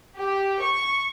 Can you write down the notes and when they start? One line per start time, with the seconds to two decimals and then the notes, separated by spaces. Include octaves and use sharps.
0.15 G4
0.61 C#6